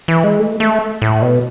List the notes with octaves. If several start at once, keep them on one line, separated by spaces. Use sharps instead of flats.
E3
G#3
A3
A3
A2
B2